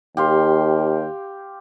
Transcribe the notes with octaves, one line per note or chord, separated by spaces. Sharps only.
D#2 G4 F5 C6